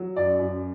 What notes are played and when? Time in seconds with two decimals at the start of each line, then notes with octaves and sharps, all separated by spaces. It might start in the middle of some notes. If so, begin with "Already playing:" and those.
Already playing: F#3
0.16 F#2 D5
0.39 F#2